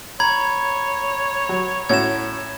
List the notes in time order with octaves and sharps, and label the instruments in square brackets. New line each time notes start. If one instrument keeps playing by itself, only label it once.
[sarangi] C#5 [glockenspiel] A#5 B5 G#6
[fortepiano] F#3
[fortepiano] A2 C#4 F#4 [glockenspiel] G#6 E7